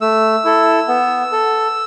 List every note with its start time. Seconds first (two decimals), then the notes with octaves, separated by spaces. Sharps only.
0.01 A3 E6
0.45 E4 A4
0.88 B3
1.32 A4